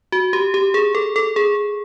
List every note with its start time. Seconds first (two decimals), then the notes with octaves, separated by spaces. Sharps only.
0.12 F#4
0.33 G4
0.54 G4
0.74 G#4
0.95 A4
1.16 A4
1.36 G#4